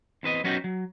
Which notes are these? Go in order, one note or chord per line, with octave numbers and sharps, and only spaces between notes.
E2 C4 B4 D#5
F#3 B3 C#4 D#4 F#4 G4
F#3